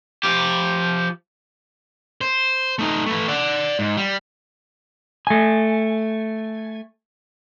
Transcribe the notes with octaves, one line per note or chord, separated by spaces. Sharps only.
F3 G4
C5
A3 D#4
A3 B4
D5 F#5
G#2
G3
A3 G#5